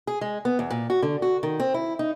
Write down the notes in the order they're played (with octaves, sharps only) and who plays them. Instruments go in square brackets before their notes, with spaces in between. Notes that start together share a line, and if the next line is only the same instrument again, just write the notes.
[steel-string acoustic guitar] G#4
G#3
B3
E2
A#2
F#4
D3
F#4
D#3
C4
E4
D#4